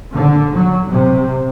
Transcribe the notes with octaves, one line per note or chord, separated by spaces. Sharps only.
D3
F#3
C3